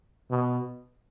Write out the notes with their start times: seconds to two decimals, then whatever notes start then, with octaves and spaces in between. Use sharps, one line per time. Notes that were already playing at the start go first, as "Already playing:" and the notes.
0.30 B2